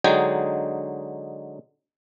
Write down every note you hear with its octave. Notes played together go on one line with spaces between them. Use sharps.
D3 F#3 G#3 D#4 G5 G#5